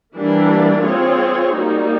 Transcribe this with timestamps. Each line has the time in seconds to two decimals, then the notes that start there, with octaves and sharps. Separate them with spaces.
0.15 E3 G3 A#3 D4
0.84 C4 F4 G#4 C#5
1.54 G3 A#3 D#4 F#4